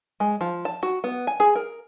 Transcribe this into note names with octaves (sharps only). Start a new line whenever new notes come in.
G#3
F3
A5
F#4
B3
G#5
G#4
A#4